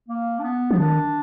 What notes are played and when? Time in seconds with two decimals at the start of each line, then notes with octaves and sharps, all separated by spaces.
0.08 A#3
0.39 D4
0.43 B3
0.71 F3 B3
0.78 D#3 D4